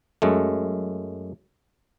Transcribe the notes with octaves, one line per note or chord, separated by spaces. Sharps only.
F#2 G#3 A3